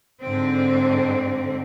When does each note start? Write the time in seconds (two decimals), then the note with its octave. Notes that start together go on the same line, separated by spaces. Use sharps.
0.22 G#2 D3 C4